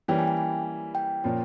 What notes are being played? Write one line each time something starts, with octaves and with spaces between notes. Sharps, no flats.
E3 G3 A#3 C#4 E4 G5
G#5
G5
G#5
G5
A#2 F3 A#3 C#4